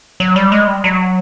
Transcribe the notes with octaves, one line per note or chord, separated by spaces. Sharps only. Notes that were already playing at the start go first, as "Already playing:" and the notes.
F#3
G3
G#3
G3
F#3